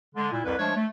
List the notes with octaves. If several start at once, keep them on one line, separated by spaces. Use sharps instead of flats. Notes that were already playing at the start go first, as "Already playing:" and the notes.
D3 G#3
A#2 E4
C2 F2 B4
F3 G#3 A3 D4 C#5
A3